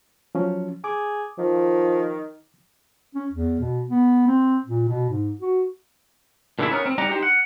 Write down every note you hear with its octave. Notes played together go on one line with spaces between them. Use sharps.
F3 F#3 C#4
G#4 D6
D#3 F3
C#4
E2
B2
B3
C4
A#2
B2
G#2
F#4
A#2 D3 E3 G#3 D4 E4
B3 C#4 D#4 A4 A#4
C4
G3 D#4 G4 D5 F#5 A#5
D#4 G4 C5
F#5